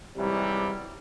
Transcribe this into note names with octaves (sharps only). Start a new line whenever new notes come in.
G#2 C3 E3 F#3 G3